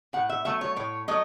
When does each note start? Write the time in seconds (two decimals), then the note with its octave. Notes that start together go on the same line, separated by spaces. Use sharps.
0.13 A2 F#5
0.29 E5
0.45 F#3 A3 E5
0.61 C#5
0.76 A2 C#5
1.08 F#3 A3 D#5